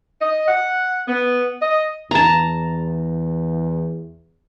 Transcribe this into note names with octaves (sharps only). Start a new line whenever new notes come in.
D#5
F#5
B3
D#5
E2 A5 A#5